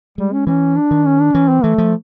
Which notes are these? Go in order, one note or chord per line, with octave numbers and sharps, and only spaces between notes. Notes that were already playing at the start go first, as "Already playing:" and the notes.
G3 G#3
C#4
E3 C#4
D4
D#3
C#4
D4
E3 C#4
C4
E3 A3
F3